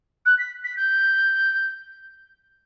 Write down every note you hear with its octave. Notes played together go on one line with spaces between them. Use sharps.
F#6
B6
B6
G6